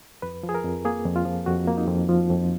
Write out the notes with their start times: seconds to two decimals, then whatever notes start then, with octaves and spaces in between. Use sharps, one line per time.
0.22 F2 B4
0.43 F3
0.49 G#4
0.55 A#4
0.64 F2
0.85 A#3 G#4
1.05 F2
1.16 F4
1.25 F3
1.46 F2 F#4
1.68 A#3
1.77 D#4
1.88 F2
2.09 F3
2.30 F2